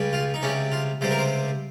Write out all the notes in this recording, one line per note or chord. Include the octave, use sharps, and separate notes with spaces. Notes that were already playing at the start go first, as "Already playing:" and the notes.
Already playing: C#2 C#3 G3
F4
D#4
C#2 C3 G3 C#4
F4
C#2 C3 G3 C5
A#4
C5